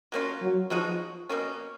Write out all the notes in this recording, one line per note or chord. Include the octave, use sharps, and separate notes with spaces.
F#3 A#3 C#4 F4
F#3
B2 F3 G#3 D#4 F#4
B2 A#3 C#4